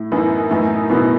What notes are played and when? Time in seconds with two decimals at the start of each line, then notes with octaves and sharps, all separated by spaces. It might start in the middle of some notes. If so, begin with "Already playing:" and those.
Already playing: A2
0.12 F#2 E3 B3 D#4
0.51 F#2 A2 E3 B3 D#4
0.89 F#2 B2 E3 B3 D#4